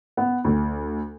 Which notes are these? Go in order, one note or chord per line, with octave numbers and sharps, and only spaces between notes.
B3
D2